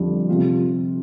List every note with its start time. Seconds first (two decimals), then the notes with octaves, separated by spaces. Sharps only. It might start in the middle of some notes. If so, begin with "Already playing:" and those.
Already playing: F2 D3 G3
0.28 C3 F3 C4 F4